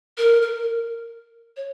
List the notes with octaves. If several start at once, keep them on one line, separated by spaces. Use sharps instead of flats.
A#4
A#4
C#5